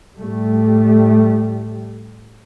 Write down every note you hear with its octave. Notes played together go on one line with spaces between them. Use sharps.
A2 G3 A3